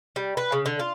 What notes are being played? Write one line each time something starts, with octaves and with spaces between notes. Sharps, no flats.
G3
B4
C#3
D3
F4